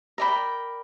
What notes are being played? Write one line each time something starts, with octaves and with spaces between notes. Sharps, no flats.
A#4 D5 G5 B5